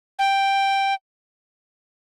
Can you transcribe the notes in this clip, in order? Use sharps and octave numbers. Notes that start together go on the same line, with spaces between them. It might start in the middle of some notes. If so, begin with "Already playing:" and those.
G5